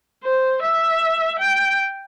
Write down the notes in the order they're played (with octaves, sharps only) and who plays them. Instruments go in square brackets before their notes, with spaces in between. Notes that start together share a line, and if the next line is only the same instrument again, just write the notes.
[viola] C5
E5
G5